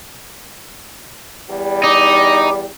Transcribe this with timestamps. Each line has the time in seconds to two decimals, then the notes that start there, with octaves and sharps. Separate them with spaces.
1.51 E2 G3
1.84 D#4 D6